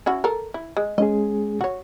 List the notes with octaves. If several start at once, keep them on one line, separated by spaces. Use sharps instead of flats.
C#4 E4 F#4
A4 A#4
E4
G#3
G#3 C#4 G#4 D#5
F#4 C#5